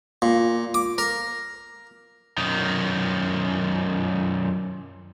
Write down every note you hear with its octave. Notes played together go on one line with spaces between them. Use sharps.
A#2
D6
A#4
F#2 D#3